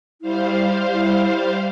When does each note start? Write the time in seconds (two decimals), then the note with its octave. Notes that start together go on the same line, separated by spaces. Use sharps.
0.22 G3 E4 C5 F5
0.93 E4